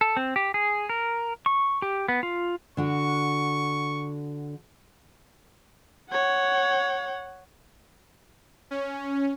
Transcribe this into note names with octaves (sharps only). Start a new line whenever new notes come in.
A4
C4
G4
G#4
A#4
C#6
G4
B3
F4
D3 D4 F#4 C#6
C#5 F#5
C#4